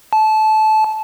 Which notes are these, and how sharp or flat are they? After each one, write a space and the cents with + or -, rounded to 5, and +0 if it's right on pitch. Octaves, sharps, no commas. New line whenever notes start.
A5 -20